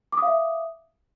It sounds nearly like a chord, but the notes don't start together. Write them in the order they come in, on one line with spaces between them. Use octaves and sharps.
D6 D#6 F5 E5